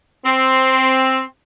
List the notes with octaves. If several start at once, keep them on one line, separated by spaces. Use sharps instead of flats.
C4